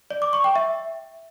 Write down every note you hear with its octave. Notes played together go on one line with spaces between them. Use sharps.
D5
D6
C#6
G5
E5